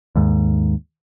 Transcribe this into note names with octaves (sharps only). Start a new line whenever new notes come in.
D#2 G#2